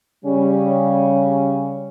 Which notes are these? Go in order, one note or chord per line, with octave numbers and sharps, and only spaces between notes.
C#3 G3 C#4